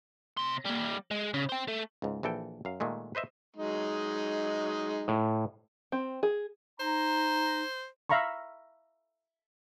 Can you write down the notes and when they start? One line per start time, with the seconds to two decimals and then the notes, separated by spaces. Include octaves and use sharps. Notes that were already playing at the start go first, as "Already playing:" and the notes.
0.37 C3 C6
0.65 G3 A#3
1.11 G#3
1.34 C#3
1.49 C5 G5
1.68 A3
2.02 C#2 G#2
2.23 A#1 E3 A4 G5
2.65 F#2 F5
2.80 A#2 D#3 G#3 A3
3.15 B4 C5 D#5 E5
3.56 F#3 G#3 D#4
5.08 A2
5.92 C4
6.23 G#4
6.80 D#4 C5 A#5
8.09 E5 F5 A#5 B5 C#6